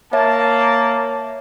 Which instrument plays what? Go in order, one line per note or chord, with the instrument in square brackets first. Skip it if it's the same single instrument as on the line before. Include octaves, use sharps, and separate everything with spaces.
[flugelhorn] A#3 [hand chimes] C#5 E5 [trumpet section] A5